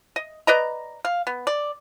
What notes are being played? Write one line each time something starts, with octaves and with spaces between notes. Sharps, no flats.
D#5
B4 D5 D#5 A#5
F5
B3
D5